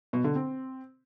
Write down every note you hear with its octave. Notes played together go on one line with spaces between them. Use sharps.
B2
D3
C4